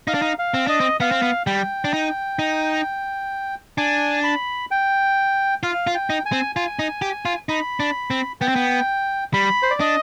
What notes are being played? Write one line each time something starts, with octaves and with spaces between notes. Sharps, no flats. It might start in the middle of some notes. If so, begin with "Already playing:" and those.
D#4 F5
D4
D#4
F5
C4
D4 D#5
C4
B3 F5
C4
B3
G3 G5
D4
D#4
D#4
D4 G#5
B5
G5
F4 F5
F4
G5
D#4
G#5
C4
F4 G#5
D#4
G4
F4
D#4 B5
D4
C4
B3 G5
C4
B3
G3 B5
C5
D5
D4 D#5